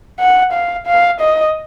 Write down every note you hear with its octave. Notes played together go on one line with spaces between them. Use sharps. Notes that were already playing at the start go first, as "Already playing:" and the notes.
F#5
F5
F5
D#5